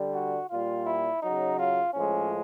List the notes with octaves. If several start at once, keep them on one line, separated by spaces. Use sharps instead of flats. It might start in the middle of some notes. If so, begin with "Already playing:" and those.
Already playing: D3 G3
F#4
A#2 G3 F4
E4
C#3 F#3 D#4
F4
A2 F3 G#3 C#4